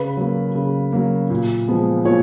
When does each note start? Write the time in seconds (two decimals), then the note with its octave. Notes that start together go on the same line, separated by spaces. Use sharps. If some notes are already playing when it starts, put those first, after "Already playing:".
Already playing: C#3 B4
0.17 F#3 A#3
0.55 C#3
0.93 F#3 A#3
1.30 A#2
1.68 F3 G#3 B3
2.05 A#2 C#5